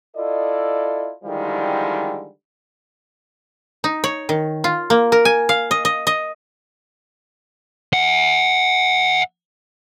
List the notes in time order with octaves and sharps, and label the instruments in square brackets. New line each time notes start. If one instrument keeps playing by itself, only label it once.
[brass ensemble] E4 F4 A4 D5 D#5
D3 D#3 F3 G3 G#3 E4
[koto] D#4
C#5
D#3
F4
A#3
A#4
G#5
F5
D#5
D#5
D#5
[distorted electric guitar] E5 F#5